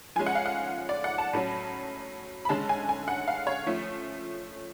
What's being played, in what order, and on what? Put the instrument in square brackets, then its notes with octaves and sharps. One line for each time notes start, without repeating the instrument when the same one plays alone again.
[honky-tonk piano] F3 G#3 C#4 G#5
F#5
F5
F#5
D5
F#5
A5
A2 F#3 C#4
B5
D3 G#3 C#4 A5
G#5
G#5
F#5
F5
C#5
F3 A3 C#4